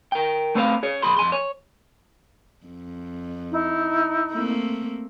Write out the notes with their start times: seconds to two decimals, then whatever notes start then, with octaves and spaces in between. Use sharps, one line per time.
0.12 A#4 G5
0.55 A3 C4 B4 C5 E5 F5
0.83 G#4 C#5
1.02 B1 G#4 B5 C6
1.17 F2 G#5 C6
1.32 C#5
2.66 F2
3.50 D#4 E4
4.32 A3 A#3 C4